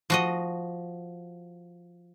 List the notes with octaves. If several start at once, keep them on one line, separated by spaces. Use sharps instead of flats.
F3 F#4 D#5